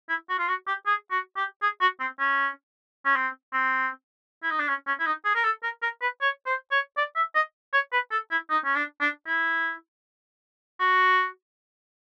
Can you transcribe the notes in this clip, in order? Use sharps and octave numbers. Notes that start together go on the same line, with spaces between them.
E4
F#4
F4
F#4
G4
G#4
F#4
G4
G#4
F#4
C4
C#4
C#4
C4
C4
E4
D#4
D4
C#4
C#4
E4
D#4
G#4
A#4
A4
A#4
A#4
B4
C#5
C5
C#5
D5
E5
D#5
C#5
B4
A4
E4
D#4
C#4
D4
D4
E4
F#4